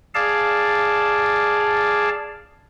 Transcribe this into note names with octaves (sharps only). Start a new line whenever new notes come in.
G#4 D5 F5 A5